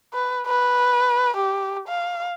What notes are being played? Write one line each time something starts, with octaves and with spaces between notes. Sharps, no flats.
B4
B4
G4
F5